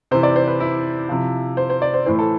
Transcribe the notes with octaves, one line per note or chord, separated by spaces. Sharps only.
C3 E3 C5
D5
C5
B4
E4
C3 F3
C5
C5
D5
C5
A2 E3 C5
A4